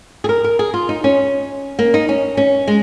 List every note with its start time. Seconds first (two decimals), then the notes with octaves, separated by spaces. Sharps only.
0.24 G#4
0.29 A#4
0.44 A#4
0.59 G#4
0.74 F4
0.89 D#4
1.04 C#4
1.79 A#3
1.94 D#4
2.09 C#4
2.37 C#4
2.67 G#3